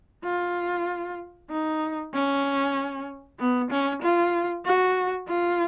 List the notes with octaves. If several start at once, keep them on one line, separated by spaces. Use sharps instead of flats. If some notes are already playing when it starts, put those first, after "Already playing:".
F4
D#4
C#4
B3
C#4
F4
F#4
F4